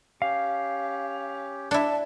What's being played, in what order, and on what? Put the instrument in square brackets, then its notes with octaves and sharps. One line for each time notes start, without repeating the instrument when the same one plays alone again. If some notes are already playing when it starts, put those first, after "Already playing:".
[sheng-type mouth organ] C#4 G4 [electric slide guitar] F5
[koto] D4 E4 [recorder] A5